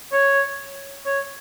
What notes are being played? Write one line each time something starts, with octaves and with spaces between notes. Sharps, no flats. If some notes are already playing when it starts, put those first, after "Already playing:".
C#5
C#5